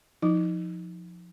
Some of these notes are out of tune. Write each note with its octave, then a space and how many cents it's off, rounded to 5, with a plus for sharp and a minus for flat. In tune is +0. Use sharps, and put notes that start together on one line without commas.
F3 +10 D#4 +25